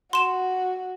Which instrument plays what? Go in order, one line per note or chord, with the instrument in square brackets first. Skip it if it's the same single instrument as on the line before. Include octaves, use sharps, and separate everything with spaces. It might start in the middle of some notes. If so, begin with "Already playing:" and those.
[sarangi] F#4 [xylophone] C6 E7